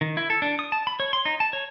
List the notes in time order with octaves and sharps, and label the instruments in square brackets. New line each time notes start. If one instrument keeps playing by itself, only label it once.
[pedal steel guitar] D#3
E4
A4
D4
D#6
A5
B5
C#5
C6
D#4
A5
C#5